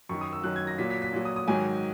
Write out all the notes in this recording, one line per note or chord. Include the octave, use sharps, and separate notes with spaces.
F#2 D#3 F#3 C#6
D#6
E6
F#2 D#3 F#3 F#6
G#6
A#6
A#2 F#3 B6
B6
B6
A#2 F#3
D#6
D#6
G#2 D#3 F#3 G#5